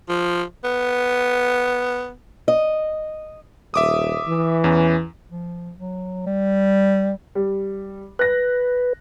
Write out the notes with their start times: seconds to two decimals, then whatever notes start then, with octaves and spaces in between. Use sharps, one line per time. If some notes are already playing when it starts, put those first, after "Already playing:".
0.09 F3
0.64 B3
2.48 D#5
3.74 D#1 E5 D6 D#6
4.27 E3
4.64 E2 C#4
5.31 F3
5.78 F#3
6.26 G3
7.35 G3
8.19 B4 F#6 A#6